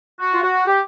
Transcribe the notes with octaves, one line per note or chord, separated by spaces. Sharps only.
F#4
F4
F#4
G4